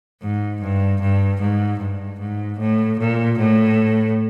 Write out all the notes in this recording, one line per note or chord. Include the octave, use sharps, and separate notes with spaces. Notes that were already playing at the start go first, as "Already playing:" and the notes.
G#2
G2
G2
G#2
G2
G#2
A2
A#2
A2